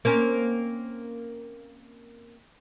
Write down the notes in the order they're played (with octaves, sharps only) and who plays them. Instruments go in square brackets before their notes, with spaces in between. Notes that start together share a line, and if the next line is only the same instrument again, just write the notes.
[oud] A#3 C4 C#4